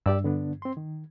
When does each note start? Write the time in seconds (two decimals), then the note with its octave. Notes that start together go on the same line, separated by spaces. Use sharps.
0.06 G2 G4 D5 E6
0.24 D3 B3 D4
0.62 C4 C6
0.77 D#3